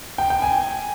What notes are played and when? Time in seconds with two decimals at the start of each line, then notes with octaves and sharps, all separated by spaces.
0.18 G5
0.30 G5
0.42 G#5